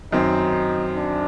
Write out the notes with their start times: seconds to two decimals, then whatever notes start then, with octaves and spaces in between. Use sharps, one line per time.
0.12 F#2 D#3 F#3 C4 D#4
0.96 D4